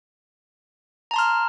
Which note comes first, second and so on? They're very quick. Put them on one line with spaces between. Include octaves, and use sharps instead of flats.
A#5 A5 C6 F6